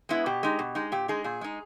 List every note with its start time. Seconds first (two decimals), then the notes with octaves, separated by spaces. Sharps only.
0.09 G#3 B3 E4
0.26 B2 G4
0.43 G#3 D#4
0.59 B2
0.75 G#3 D#4
0.92 A#2 G4
1.08 G#3 D#4 G#4
1.24 A#2 G#4
1.41 G#3 D#4